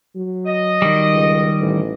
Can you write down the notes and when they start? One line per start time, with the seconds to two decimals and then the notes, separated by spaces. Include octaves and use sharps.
0.15 F#3
0.47 D#5
0.82 D#3 G3
1.13 C#2
1.61 A1